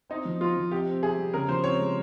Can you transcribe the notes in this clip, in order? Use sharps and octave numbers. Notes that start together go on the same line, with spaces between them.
C4 D#4
F3
F3 F4
F3
C3 G4
C4
C3 G#4
G3
C#3 A#4
F3 C5
C4 C#5
G#3